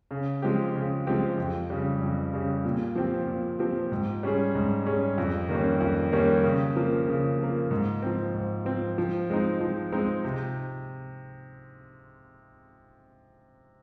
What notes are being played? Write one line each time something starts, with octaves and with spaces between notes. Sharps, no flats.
C#3
F3 G#3 C4 G4
C#3
F3 G#3 C4 G4
F2
C#3 G3
F2
C#3 G3
A#2
F3 C4 G4
A#2
F3 C4 G4
G#2
G3 C#4 G#4
G#2
G3 C#4 G#4
F2
D#3 G3 A#3 C#4
F2
D#3 G3 A#3 C#4
C#3
F3 A#3
C#3
F3 A#3
G#2
F3 C4
G#2
F3 C4
F3
G#3 C4 D#4
F3
G#3 C4 D#4
C3